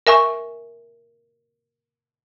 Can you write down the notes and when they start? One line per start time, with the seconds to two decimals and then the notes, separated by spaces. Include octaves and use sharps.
0.07 A#4 E5 G#5 C#6